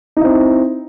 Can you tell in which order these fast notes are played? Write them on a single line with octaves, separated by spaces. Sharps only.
D#4 E4 C4